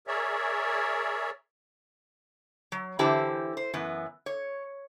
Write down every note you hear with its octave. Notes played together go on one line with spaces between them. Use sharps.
G#4 A#4 C#5 D5 E5
F#3
D3 E3 E4 G4 C5 A5
C5
F#2 E3 B3
C#5